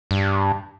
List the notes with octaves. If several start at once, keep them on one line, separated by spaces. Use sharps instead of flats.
G2